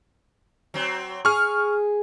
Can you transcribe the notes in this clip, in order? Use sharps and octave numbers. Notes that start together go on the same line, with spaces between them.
F#3 C4
G#4 C#6 F6